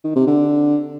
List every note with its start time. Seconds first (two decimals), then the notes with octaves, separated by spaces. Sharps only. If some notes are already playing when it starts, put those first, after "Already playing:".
0.04 D#3
0.16 C3
0.27 D3